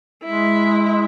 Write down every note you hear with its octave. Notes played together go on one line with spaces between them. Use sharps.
G#3 E4